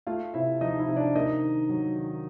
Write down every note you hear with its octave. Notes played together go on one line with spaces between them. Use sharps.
A3 F4 F5
C3 E4 E5
F3 D#4 D#5
E4 E5
C3
D4 D5
A#3 D#4 D#5
D#3
F#3
D#3